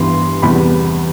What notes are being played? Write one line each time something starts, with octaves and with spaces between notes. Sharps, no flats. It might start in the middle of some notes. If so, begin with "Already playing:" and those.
Already playing: G2 E3 B3 C6
E2 C3 G3 B3 B5